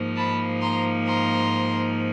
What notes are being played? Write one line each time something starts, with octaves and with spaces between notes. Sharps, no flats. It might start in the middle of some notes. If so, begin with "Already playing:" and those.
Already playing: G#2 F3 A#3 D#4
A5 B5
A#5 C6
A#5 C6